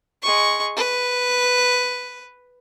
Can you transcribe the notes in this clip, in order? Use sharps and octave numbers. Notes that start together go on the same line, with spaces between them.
G#3 C#6
B4